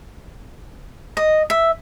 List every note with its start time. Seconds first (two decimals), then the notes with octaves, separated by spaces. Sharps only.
1.17 D#5
1.50 E5